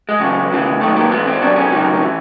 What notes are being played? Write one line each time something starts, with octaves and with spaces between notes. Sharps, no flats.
G#3
E2 C#3 F#3
D#2 C#3 E3
G#2 D#3 F#3 A3
A#3
G#2 E3 B3
C4
C2 B2 F#3 D4
C#4
C#2 C3 D#3 F#3
E3